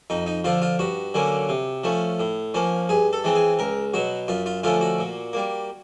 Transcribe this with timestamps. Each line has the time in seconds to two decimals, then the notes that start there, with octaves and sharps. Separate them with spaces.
0.10 F2 D#4
0.26 D#4
0.44 D3 F3 F4
0.62 F4
0.79 G2 F#4
1.14 D3 F#3 A#3 C#4
1.49 C3
1.84 F3 A3 C#4
2.20 A2
2.54 F3 A#3 C#4
2.89 G2 G#4
3.13 A4
3.24 E3 G#3 C4
3.35 G#4
3.59 C#2 A#4
3.94 B2 F#3 F#4
4.28 F#2 F4
4.46 F4
4.63 D3 F3 A3 C#4 F4
4.81 F#4
4.99 A#2
5.33 G3 A#3